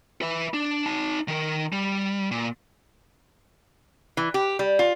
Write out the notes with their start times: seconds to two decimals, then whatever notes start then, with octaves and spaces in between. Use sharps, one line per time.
0.22 B4 E5
0.54 D4
0.86 D#4 A5
1.28 D#3 A#4
1.72 G3
2.31 A#2
4.17 E3
4.34 G4
4.59 G3
4.79 F4